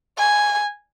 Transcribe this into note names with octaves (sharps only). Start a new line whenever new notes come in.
G#5